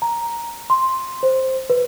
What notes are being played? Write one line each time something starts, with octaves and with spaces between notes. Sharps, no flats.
A#5
C6
C5
B4